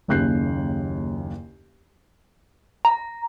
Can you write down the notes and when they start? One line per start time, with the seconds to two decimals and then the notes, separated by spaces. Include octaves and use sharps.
0.08 F#1 D#2 C#3 F#6 G6 C7
2.85 A#5